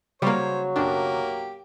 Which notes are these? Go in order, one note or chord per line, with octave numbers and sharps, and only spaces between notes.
C#3 F#3 G3 A#3 C5 C#5
B1 F#2 A#3 D4 G4